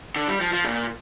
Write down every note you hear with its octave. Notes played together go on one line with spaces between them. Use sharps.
D3
G3
F3
F3
A#2